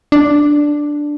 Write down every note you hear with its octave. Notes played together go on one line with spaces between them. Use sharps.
D4